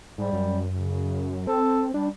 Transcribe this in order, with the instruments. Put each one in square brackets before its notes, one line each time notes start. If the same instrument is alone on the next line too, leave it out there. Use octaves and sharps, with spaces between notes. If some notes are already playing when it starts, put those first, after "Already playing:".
[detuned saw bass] G#2 [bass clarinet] G3
[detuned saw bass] F#2
[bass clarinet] C#3
[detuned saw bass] C4 [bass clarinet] A4
[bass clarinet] G3 [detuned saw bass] D4